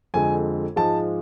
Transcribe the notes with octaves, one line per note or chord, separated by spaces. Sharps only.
F2 D3 G#3 G#5
G#2 F3 G#3 A5